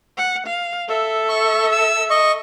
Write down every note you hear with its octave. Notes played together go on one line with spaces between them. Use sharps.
F#5
F5
A4 E5
C#6
E6
D#5 C#6